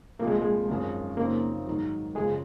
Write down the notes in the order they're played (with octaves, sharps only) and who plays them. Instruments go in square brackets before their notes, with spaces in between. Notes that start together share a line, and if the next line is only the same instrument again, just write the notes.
[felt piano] C2 A#2 F3 [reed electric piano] A#3
[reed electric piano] G#3
G#3
[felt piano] G#1 F#2 F3 G#3 C#4
[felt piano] F#2 C#3 F3 C4 D#4 [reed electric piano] A#3
[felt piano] G#2 D#3 F#3
[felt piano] F#2 C#3 F3 [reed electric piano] G#3 G#4